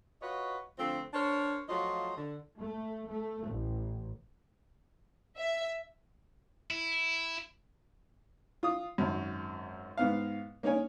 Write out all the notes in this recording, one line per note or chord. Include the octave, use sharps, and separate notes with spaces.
F4 F#4 B4 C#5 D#5
D3 F3 A3 C4
D4 A#4 C5 C#5
F3 F#3 A3 F4 D#5
D3
A3
A3
A1
E5
E4
F4 D#6
G#1 F#2
G#2 B3 F5
A#3 C#4 D#4 A#4 C#5 G#5